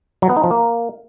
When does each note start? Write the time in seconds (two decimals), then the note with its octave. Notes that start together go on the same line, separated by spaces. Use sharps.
0.22 F#3
0.29 B3
0.36 D#4
0.44 F3
0.51 A#3